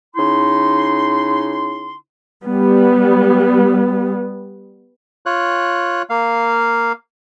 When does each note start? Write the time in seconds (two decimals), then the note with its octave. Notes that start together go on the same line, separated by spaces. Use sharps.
0.16 C#3 D#4 E4 C6
2.45 G3 B3
5.26 F4 C#5 F#6
6.10 A#3 F5